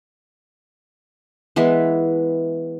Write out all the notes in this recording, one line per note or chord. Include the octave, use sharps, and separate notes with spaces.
E3 G#3 B3 E4